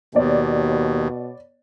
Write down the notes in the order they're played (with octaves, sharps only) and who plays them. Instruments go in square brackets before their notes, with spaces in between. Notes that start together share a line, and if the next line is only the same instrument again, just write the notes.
[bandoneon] D#2 [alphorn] B2 [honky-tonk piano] B3 C#5 D5